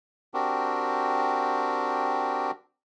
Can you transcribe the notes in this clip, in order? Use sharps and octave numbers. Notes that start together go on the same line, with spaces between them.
C4 D4 F#4 G4 A#4